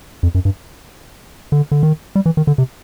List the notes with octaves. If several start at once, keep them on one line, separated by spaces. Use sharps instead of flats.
F2
F#2
G2
D3
D3
D#3
G3
E3
D#3
D3
C3